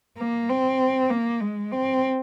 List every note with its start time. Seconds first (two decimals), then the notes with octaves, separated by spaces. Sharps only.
0.18 A#3
0.49 C4
1.10 A#3
1.41 G#3
1.71 C4